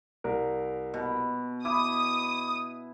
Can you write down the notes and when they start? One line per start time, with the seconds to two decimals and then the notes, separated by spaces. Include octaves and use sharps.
0.24 C2 A#4
0.94 B2
1.65 E4 D6 D#6